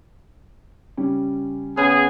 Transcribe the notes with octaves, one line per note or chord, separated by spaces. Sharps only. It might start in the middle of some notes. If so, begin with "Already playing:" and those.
C#3 G3 C#4
C#3 B3 G#4